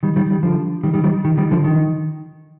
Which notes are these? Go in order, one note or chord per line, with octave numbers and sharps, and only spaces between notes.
D#3 G3
D#3 G3
D#3 G3
D3 F3
D#3 G3
D#3 G3
D#3 G3
D#3
D#3 G3
D3 F3
D#3